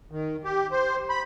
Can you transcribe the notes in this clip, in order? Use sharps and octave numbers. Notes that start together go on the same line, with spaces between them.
D#3
G4
C5
B5